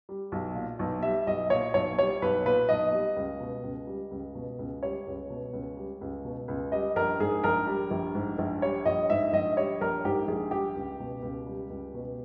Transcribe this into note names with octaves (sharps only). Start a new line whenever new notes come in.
G3
B1
A#2
B1
G3 E5
B1 D#5
A#2 C#5
B1 C#5
G3 C#5
B1 B4
A#2 B4
B1 D#5
G3
C#2
B2
C#2
G3
C#2
B2
C#2
G3 C#5
C#2
B2
C#2
G3
C#2
B2
C#2
G3 D#5
A#1 A#4
G#2 G#4
A#1 A#4
G3
A#1
G#2
A#1
G3 C#5
A#1 D#5
G#2 E5
A#1 D#5
G3 C#5
A#1 A#4
G#2 G4
A#1 G#4
G3 G4
C#2
B2
C#2
G3
C#2
B2